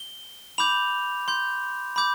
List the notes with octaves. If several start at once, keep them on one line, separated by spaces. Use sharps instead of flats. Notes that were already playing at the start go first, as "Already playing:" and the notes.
Already playing: G7
B5 D6 G6 F7
C6 G6
B5 D6 G6